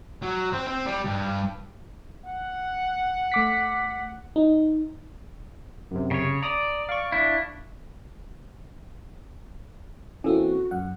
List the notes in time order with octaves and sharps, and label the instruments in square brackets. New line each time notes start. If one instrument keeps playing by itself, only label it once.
[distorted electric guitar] F#3
C4
C4
G3
G2
[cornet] F#5
[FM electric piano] A3 D6 B6
D#4
[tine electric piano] F#2 C3
[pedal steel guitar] C#3 C#5
[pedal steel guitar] D5 [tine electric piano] A#5 D#6 A#6
[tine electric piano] F5 C#6
[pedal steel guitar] D4 E4
[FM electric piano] E3 A#3 C4 [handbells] C#4 A4 [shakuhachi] F#4
[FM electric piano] F#2 F#5